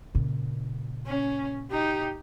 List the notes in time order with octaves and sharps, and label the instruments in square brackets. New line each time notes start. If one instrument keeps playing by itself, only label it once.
[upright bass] A#2 C#3
[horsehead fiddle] C#4
D#4 G4